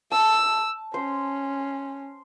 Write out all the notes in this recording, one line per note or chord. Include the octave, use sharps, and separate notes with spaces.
A5 E6
C#4 C5